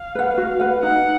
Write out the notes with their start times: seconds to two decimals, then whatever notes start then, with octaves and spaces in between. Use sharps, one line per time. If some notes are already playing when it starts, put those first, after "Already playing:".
Already playing: F5
0.15 B4 F#5
0.38 F#4
0.60 B4 F#5
0.82 D#4 F#5